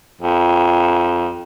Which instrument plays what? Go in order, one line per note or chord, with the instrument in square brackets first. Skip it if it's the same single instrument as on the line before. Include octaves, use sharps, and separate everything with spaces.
[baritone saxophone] F2